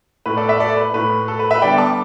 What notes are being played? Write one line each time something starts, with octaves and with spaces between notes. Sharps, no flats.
A2 A3 B4
A4 D5
B4 E5
A4 D5
B4
A2 A3 B4
A4
B4
B4 E5
D3 G3 B3 D5 G5
A5 D6